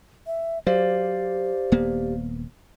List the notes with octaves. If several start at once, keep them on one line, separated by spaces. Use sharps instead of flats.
E5
F#3 G4 C5 D5 F5
D#1 A#3 B3